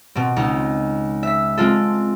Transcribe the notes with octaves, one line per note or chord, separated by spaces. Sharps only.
B2 C4
C#2 D#4
E5 B6
G#3 C4 F4 A4